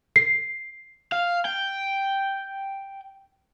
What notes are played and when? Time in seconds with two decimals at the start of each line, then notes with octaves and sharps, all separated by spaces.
0.16 C7
1.12 F5
1.45 G5